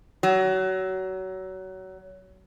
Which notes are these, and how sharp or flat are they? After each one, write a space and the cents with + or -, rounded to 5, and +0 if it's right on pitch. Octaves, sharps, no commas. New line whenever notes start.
F#3 +25